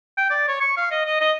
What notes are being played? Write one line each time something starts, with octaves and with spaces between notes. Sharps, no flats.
G5
D5
C#5
C#6
F5
D#5
D#5
D#5